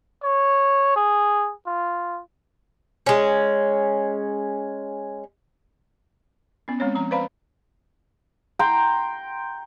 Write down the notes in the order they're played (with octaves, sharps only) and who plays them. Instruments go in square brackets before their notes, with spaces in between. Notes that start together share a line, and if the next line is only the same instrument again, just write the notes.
[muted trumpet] C#5
G#4
F4
[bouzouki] G#3 C#4
[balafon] B3 C#4
G#3 C4 C#4 C#5
F3 A#5
B4 C5 D5 F5 A#5 B5
[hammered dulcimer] G5 A#5 C6